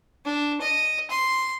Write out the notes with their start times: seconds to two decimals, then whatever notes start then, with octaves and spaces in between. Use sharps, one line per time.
0.25 D4
0.61 D#5
1.10 C6